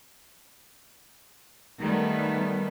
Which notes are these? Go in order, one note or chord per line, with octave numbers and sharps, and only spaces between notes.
D#3 G3 A3 B3